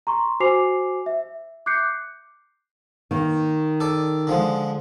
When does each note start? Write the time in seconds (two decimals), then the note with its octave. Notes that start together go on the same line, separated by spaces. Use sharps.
0.07 A#5 C6 C#6
0.40 F#4 C5 G#5 D6 C7 F7
1.06 E5
1.66 D6 F#6 G6 C7 C#7
3.11 D#3 A#3
3.80 A4 D5
4.27 D3 F3 G#3